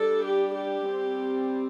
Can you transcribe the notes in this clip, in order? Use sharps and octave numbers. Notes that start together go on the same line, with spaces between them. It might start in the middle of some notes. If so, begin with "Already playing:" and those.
Already playing: G3 D4 A4
G4
G4
G3 C4